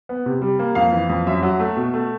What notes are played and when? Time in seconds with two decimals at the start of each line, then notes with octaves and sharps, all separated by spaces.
0.09 B3
0.26 C3
0.42 G3
0.59 A#3
0.75 F2 F5
0.92 E3
1.10 F2
1.27 F#2 E5
1.43 F#3
1.59 A3
1.77 B2
1.94 A3